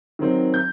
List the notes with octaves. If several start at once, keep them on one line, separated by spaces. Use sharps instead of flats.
D#3 F#3 C4
G6